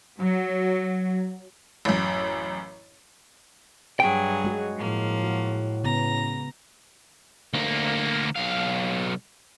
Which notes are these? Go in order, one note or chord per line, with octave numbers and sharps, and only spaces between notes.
F#3
A1 F#2
G2 F#3 G#4 G5
G#3 F#4 C#5
A2 F3 A#3
F#4
C#3 B3 A#5 A#6
D2 A#3
B1 F5